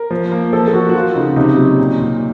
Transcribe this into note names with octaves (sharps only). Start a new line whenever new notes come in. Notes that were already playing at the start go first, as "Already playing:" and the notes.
Already playing: A#4
F3
A#3
F3 A4
A4
F3 F#4
F#4
F3 F4
C#3 D#4
C3 D#4
F#3
A#2
A#2